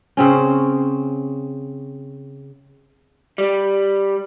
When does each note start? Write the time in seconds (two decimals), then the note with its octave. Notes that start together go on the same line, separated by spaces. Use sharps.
0.17 C#3 C4 C#4
3.38 G3